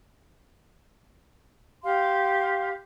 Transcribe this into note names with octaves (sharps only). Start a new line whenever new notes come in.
G4 F5 C6